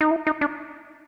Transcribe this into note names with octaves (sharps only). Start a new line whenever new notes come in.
D#4
E4
D#4
D4